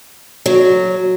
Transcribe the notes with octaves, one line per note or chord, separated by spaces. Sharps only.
F#3